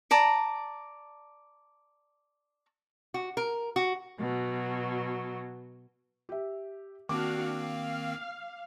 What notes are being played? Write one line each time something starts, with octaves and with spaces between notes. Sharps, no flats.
D5 A5 A#5
F#4
A#4
F#4
B2 F#3
G4 E5
D#3 A#3 C4 D4 F#4 F5 D6
F5